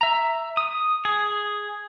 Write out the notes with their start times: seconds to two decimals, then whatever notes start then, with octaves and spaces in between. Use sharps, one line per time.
0.01 E5 A#5
0.57 D#6
1.05 G#4